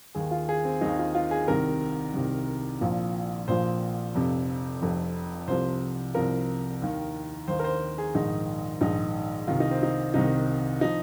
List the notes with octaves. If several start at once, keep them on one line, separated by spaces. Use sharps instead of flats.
D#2 D#3 G#4
F4
G#4
C4
D#2 D#3 D#4
F4
F4
G#4
C2 C3 D#3 A#4
C2 C3 D#3
A#1 A#2 F3
A#1 A#2 F3 C5
F1 F2 C3
F1 F2 C3
C2 C3 F3 C5
C2 C3 F3 A#4
D#2 D#3
D#2 D#3 C5
A#4
C5
G#4
A#1 G#2 D#3 D#4
A#1 G#2 D#3 D#4
C2 C3 D#3 F4
D#4
C4
D#4
C2 C3 D#3 D#4
F3 D#4